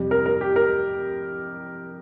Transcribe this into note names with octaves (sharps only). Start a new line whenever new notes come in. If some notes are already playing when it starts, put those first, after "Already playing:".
Already playing: F2 C3 G3
A#4
A#4
G4
A#4